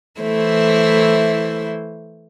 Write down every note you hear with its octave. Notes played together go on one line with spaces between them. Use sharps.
E3 A3 E4 C5